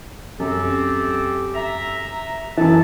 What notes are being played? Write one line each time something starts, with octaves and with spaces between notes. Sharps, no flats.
F#2 C4 G4 A4
E5 A#5
F#2 E3 A4 A5